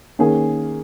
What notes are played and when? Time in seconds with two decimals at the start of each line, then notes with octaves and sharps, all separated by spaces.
0.19 D#3 A#3 C#4 G#4